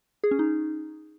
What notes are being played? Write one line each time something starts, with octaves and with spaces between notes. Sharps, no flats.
G#4
C#4
D#4